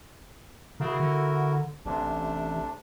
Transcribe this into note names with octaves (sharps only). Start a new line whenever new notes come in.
C#3 E4 F#4 A#4
D3
A1 C3 A3 D4